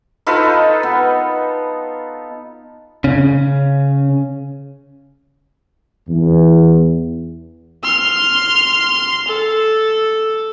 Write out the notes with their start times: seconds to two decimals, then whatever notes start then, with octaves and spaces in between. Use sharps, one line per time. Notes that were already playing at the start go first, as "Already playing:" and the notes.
0.27 D#4 F4 A4 B4
0.83 B3
3.04 C#3 C#4
6.08 E2
7.83 C6 F6
9.28 A4